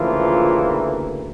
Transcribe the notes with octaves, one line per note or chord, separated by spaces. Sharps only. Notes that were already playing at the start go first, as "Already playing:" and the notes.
Already playing: D2 C#3 E3 F3 A#3 F4